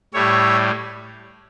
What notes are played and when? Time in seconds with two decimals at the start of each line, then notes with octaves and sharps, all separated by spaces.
0.14 A2 G3 C#5 E5